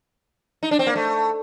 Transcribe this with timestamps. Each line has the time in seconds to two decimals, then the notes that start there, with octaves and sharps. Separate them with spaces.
0.63 D#4
0.71 D4
0.79 C4
0.87 A#3
0.96 A3